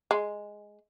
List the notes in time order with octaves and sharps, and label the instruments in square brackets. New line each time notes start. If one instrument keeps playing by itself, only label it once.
[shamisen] G#3